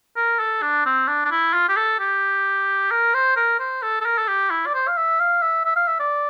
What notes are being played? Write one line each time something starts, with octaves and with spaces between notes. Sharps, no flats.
A#4
A4
D4
C4
D4
D4
E4
F4
G4
A4
G4
A#4
C5
A#4
C5
A4
A4
A#4
A4
G4
E4
D5
C5
F5
E5
F5
E5
E5
F5
E5
D5